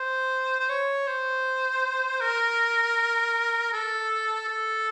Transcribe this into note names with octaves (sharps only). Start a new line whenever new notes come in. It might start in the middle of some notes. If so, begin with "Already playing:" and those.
Already playing: C5
C5
C#5
C5
A#4
A4
A4